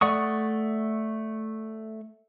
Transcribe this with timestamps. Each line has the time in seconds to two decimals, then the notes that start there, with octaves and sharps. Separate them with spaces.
0.01 A3 D5 F#5 C#6 D#6